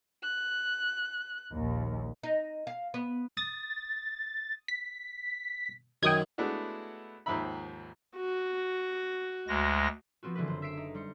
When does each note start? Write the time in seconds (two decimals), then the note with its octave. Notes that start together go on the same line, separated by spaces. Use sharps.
0.22 F#6
1.52 A#1 D#2
2.23 D#4
2.67 F5
2.94 B3
3.37 D#6 A6
4.68 B6
6.03 F#2 D#3 G5 D#6 G#6
6.38 G#3 A3 B3 D4 E4 F#4
7.26 D#2 G#2 D#3 F3 E5 B5
8.15 F#4
9.48 D2 G#3 A#6
10.23 F3 B3 C4 F4 F#4
10.35 D3 E3 G#3 C4 F4 B4
10.48 F#1 C5
10.62 E5 B6 C7 D7 E7
10.77 D#4
10.94 G3 C5 C#7